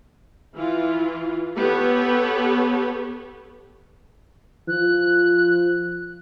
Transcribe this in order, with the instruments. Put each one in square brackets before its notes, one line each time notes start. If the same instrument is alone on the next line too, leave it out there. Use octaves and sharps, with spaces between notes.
[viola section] E3 F4
B3 G4 A4 B4 C#5
[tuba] F3 [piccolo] F#6